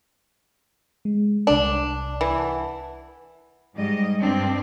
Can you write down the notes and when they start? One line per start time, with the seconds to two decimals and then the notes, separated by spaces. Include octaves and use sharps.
1.05 G#3
1.47 C2 D4 D5
2.21 E3
2.39 F#5 A5
3.75 G#2 G3 D#5
4.20 G2 C4 D4